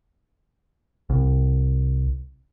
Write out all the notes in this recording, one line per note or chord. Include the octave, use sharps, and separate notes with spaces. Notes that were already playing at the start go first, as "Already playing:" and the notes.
C2